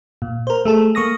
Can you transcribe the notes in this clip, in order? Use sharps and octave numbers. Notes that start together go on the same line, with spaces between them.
A#2
A#4 C5
A3 G#4 A4
A#3 C#6 D#6 A#6